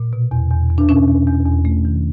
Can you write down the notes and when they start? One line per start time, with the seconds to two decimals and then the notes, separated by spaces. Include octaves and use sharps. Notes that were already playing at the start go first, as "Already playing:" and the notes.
Already playing: A#2
0.13 B2
0.31 E2
0.50 E2
0.70 E2
0.78 D4
0.89 B2 C#4
1.08 E2
1.27 E2
1.46 E2
1.65 A3
1.85 D#3